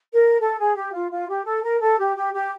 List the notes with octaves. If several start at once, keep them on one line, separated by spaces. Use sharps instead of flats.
A#4
A4
G#4
G4
F4
F4
G4
A4
A#4
A4
G4
G4
G4